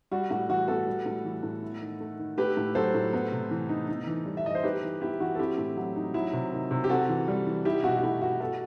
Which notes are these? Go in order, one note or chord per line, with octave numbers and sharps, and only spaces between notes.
G3 F#4
A2 F#4
E3 F#4
B3 F#4 A4
G3
A2
E3
A2
E4
D#3
A3
D#3
A3 G4 B4
A2
F#3 A4 C5
A2
B3
C3
E3
D#4
D#4
E3
G3
E5
E3 D#5
C5
D#4 G4 B4
E3
B3 E4 G4
E3 F#4
A4
C4 E4 G4
A2
F#3
D#4
F#3 E4
C3
D#3
C3
G4
C4 F#4 A4
E3
G3
E3
D#4 E4 G4
B2 F#4
F#4
A3 E4
B2 F#4
B3 F#4 A4